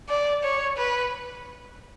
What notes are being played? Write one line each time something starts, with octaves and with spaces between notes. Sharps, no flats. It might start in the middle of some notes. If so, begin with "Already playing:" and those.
D5
C#5
B4